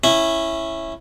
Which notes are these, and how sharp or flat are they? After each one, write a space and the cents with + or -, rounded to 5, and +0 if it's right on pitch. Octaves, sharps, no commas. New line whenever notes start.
C#4 -15 E4 +0